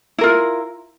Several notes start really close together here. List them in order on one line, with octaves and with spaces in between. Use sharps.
E4 A#4 F4